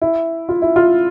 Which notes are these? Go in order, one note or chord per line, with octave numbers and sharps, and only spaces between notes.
E4
F4
E4
F4